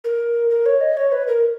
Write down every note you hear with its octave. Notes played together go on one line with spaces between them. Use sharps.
A#4
A#4
C#5
D#5
C#5
B4
A#4